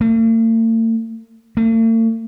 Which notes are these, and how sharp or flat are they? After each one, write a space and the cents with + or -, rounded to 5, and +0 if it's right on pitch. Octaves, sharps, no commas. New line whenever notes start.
A3 +45
A3 +45